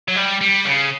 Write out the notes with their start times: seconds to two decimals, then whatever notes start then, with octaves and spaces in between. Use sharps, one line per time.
0.08 F#3
0.16 G3
0.41 G3
0.65 C#3